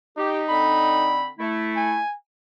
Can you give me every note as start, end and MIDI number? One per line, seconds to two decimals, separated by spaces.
0.18 1.21 63
0.18 0.41 67
0.48 1.28 50
0.48 1.28 60
0.48 1.28 83
1.39 2.00 57
1.39 2.00 64
1.76 2.15 80